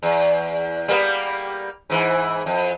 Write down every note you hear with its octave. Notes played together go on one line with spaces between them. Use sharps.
E2
G3 A#3 B3
G#2 E3
F2